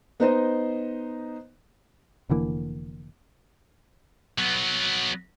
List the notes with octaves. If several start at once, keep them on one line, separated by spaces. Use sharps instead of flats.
B3 D#4 C5 D#5
F1 D3 E3 A#3
F#3 B3